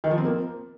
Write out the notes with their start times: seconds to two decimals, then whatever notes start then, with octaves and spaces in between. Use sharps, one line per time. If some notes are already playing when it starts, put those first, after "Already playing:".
0.04 D#3
0.11 F3
0.18 C4
0.25 A#3